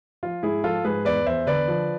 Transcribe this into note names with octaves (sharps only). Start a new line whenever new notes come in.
F3 F4
G#2 E4 G#4
F3 F4 A4
G#2 G#4 B4
E2 B4 D5
E2 C5 E5
D3 B4 D5
F3